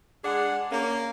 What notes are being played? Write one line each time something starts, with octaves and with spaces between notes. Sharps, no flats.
G#3 D4 G#4 F#5
A#3 C#4